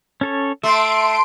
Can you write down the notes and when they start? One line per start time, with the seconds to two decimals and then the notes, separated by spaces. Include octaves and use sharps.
0.21 C#4 A4 C#5
0.63 A3 E5 C6 D7